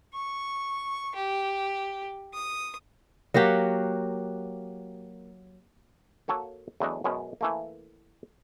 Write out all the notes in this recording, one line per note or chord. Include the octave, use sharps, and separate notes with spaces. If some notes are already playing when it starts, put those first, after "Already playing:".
C#6
G4
D#6
F#3 A#3 F#4 G4
A#3 F#4 A4 C#5
E2 F#3 A3 D4 D#5
F#2 B2 G#3 C#4
E3 A3 A#3